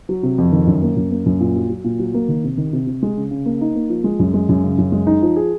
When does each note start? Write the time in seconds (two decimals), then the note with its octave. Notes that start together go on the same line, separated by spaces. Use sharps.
0.09 F#3
0.23 C3
0.38 F2
0.52 D#3
0.67 F#2
0.83 A#3
0.97 F#2
1.11 A#3
1.26 F#2
1.40 A#2
1.56 F#3
1.70 F#3
1.84 A#2
1.99 F#3
2.14 A#3
2.28 D#3
2.44 C3
2.57 D#3
2.73 C3
2.87 C3
3.03 G#3
3.17 C#3
3.31 C#3
3.46 A#3
3.61 D#4
3.75 A#3
3.89 F3
4.04 G#3
4.20 F#2
4.34 G#3
4.49 F#2
4.64 C#3
4.78 F#2
4.92 G#3
5.07 D#4
5.22 F3
5.36 G#4